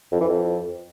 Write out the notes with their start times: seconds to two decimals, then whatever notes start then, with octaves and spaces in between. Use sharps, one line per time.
0.12 F2
0.21 E3
0.29 F2